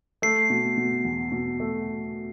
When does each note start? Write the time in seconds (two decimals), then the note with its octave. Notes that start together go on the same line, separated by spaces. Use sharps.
0.22 A3 C7
0.50 B2
0.77 B2
1.05 E2
1.32 B2
1.60 A3